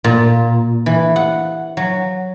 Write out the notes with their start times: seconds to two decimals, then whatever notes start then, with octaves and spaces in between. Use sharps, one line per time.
0.04 A#2
0.86 E3
1.16 F#5
1.77 F#3